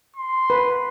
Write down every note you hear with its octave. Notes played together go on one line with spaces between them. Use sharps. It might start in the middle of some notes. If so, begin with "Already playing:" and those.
C6
B4